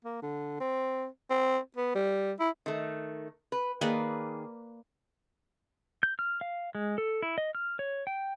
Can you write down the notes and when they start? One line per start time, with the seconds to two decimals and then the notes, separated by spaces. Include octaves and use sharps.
0.05 A#3
0.22 D3
0.60 C4
1.30 C4
1.77 B3
1.95 G3
2.40 E4
2.66 D#3 A3
3.52 B4
3.81 D#3 A#3 G#4 B4 D5
6.03 G6
6.19 F6
6.41 F5
6.75 G#3
6.98 A4
7.22 E4
7.38 D#5
7.55 F6
7.79 C#5
8.07 G5